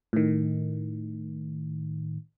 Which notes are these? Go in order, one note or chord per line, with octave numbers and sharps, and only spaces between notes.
A2 D#3